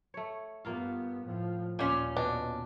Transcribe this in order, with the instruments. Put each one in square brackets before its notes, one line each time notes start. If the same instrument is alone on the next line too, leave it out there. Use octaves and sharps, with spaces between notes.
[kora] A3 C#5
[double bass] G2 B3 [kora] A#3 F4 F5
[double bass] A2 F3
[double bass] D#2 [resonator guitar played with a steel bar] A#2 C#4
[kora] B2 D#5 [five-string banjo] D4